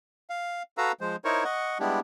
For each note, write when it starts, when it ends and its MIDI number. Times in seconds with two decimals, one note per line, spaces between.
0.30 0.63 77
0.78 0.92 66
0.78 0.92 69
0.78 0.92 71
0.78 0.92 77
0.78 0.92 82
0.78 0.92 88
1.01 1.16 53
1.01 1.16 56
1.01 1.16 72
1.25 1.44 63
1.25 1.44 64
1.25 1.44 70
1.25 1.44 72
1.25 1.44 73
1.25 1.44 85
1.44 1.78 75
1.44 1.78 78
1.44 1.78 85
1.80 2.00 55
1.80 2.00 56
1.80 2.00 59
1.80 2.00 62
1.80 2.00 64
1.80 2.00 67